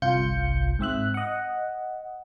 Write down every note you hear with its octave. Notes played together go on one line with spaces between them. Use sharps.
G1 C2 F4 G6 C#7
G#2 C4 E5 F#6
D#5 F#5